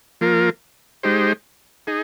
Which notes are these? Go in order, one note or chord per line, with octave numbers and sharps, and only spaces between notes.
F3 A#3 F4 A#4
G#3 D#4 G4 C5
D#4 G#4